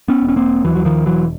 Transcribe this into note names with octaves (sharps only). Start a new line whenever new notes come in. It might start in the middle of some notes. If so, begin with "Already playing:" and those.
B3 C#4
E1
C#4
A#3 C4
D#2 E3 F#3
F#3
D#3 F3
E1 E3 F#3